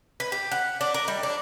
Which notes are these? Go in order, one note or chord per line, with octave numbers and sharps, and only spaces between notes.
B4
G4
F#5
D4
A#4
G3
D4